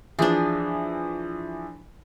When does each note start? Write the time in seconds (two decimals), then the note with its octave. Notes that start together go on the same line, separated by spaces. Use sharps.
0.19 E3 F3 D4 G#4